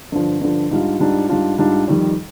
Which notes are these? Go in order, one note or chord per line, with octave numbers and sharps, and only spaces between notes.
G2 D3 F3
G2 D3 F3
G#2 G3 D4 F4
G#2 G3 D4 F4
G#2 G3 D4 F4
G#2 G3 D4 F4
F2 D#3 G3